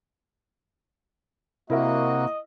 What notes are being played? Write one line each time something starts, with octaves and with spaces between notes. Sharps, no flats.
C3 A#3 E4 F#4 A#4 D#5 E5